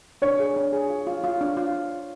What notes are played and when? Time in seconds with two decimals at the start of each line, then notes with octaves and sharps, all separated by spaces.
0.22 D4 C#5
0.40 G#4
0.56 D4
0.72 G#4
0.90 F4
1.07 F4
1.24 F4
1.41 D4
1.57 F4